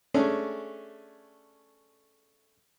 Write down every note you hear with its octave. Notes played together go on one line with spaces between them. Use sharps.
A3 C#4 D4 G#4